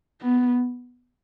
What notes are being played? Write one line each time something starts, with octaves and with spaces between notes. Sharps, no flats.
B3